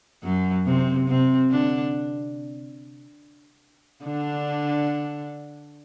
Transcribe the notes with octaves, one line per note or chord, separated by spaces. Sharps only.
F#2 F#3
C3 C4
C3 C4
D3 D4
D3 D4